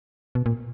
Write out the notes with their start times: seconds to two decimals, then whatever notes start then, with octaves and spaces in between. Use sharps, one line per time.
0.35 B2
0.46 A#2